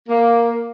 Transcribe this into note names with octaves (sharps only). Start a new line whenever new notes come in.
A#3